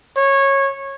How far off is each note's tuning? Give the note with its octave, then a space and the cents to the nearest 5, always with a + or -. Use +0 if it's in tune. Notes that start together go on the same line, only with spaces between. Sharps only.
C#5 -15